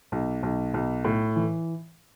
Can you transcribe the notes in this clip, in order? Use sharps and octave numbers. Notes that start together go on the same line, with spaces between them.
B1
B1
B1
A2
E3